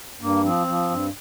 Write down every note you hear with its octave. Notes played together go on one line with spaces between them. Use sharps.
G2 A#3
F3 C4
F3
G2